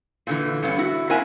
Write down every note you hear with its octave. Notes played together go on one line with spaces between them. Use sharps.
A#2 D3 E3
G2 B3 C#4
E4 F#4
A#3 C4 E4 E5 F#5 G#5